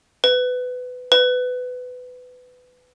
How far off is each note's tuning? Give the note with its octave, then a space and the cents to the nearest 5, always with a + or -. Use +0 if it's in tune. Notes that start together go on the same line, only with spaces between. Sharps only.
B4 +20
B4 +20